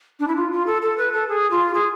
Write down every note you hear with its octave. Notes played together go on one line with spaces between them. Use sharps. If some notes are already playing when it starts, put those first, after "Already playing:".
D4
E4
F4
F4
A4
A4
B4
A4
G#4
F4
G#4